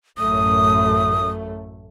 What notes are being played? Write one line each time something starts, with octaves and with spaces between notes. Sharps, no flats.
A1 F#2 A3 D#6